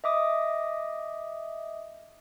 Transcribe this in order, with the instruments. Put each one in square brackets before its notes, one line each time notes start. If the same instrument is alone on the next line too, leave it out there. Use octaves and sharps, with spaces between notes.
[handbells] D#5 E5 D6 D#6